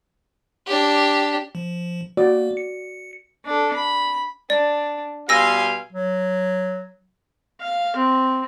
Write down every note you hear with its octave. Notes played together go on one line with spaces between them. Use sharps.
D4 G4
F3
A#3 F#4 D5
C#7
D4 A4
B5
D4 D5
B2 G3 F5 G#5 C6 E6 A#6
F#3
F5
C4